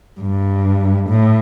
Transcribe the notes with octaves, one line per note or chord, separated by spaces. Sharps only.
G2
A2